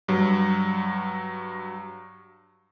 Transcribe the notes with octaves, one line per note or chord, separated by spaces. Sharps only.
G2 F#3